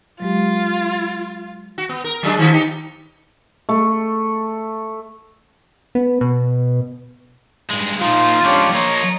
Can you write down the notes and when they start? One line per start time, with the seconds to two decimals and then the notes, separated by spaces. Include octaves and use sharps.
0.20 F#3 G#3 F4 G4
1.78 F#4
1.89 B3
2.04 A#4
2.23 F#3 G#3 D4
2.39 D#3 F3 B3
2.52 D#4 G4
3.69 A3
5.95 B3
6.21 B2
7.69 G2 G#3
8.01 A#2 F3 D#4 F4
8.44 C#2 F3 D4 G4 C#5
8.74 F3 A#3 C#5 D#5 A#5